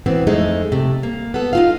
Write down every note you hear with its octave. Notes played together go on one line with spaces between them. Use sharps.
B2 E3 B3 C4
F2 G#3 A3 D#4
C3 A3
A#3
B3 A4
D#4 F4 F5